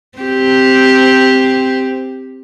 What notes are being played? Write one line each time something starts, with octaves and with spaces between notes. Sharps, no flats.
C4 G4